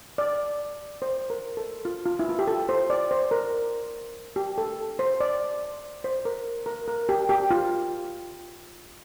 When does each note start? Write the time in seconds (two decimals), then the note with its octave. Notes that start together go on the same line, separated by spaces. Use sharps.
0.18 D5
1.02 C5
1.30 A#4
1.57 A4
1.85 F4
2.06 F4
2.19 E4
2.29 F4
2.39 G4
2.48 A4
2.69 C5
2.90 D5
3.11 C5
3.31 A#4
4.36 G4
4.58 A4
4.99 C5
5.20 D5
6.04 C5
6.25 A#4
6.66 A#4
6.88 A#4
7.09 G4
7.29 G4
7.51 F4